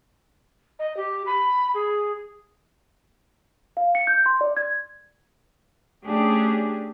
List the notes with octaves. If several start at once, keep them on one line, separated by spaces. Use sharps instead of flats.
D#5
G4
B5
G#4
F5
C#7
G6
C6
D5
G#6
A3 C#4 D4 G4 G#4